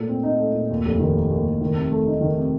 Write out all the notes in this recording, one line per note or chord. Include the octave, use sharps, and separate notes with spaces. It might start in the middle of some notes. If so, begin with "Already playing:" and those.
Already playing: A#2 A3
C4
D#4
A3
A#2
D#2
F1
D#3
A#3
D#2
F1
D#3
C3
A3
D#4
D#3
C3